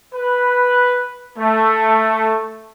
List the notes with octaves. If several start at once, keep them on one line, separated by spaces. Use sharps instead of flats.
B4
A3